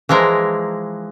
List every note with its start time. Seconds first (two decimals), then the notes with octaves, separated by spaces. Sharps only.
0.09 E3 F3 G#3 A#4